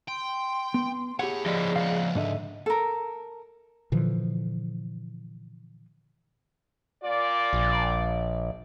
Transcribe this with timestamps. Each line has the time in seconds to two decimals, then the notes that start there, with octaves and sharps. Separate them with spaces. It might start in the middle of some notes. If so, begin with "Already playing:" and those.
0.08 G5 C6
0.74 B3
1.19 E4 G4 G#4 C#5 F#5
1.46 F3 D5 D#5
1.76 C#2 F5 F#5
2.15 G#2 D3 D#5 E5
2.66 A4 A#4
3.92 A#2 D3 E3 F3
7.04 A#2 F4 D5
7.53 A#1